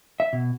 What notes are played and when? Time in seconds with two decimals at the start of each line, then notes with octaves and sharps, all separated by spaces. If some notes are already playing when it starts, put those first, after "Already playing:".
0.20 E5
0.33 B2